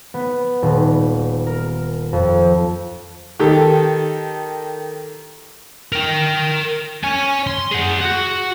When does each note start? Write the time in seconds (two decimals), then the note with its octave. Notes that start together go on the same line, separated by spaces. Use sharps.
0.14 B3
0.62 D#1
1.47 A#4
2.13 F2
3.40 D#3 G4 A4
5.92 A#4 G5
7.03 C#5 G#5
7.47 C6
7.71 G#4 F#5
8.01 F#4 F#5